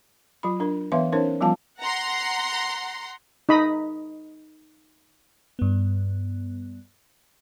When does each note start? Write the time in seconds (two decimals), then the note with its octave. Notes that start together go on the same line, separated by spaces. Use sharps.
0.43 F#3 F4 B5
0.60 D4 A#4
0.92 E3 B3 B4 E5 F5 C6
1.12 C#4 D#4 A#4 C5 C#5
1.41 F3 G3 B3 F4 F5 A5
1.80 F#5 A#5 C6
3.49 D#4 D#5 B5
5.59 G2 B3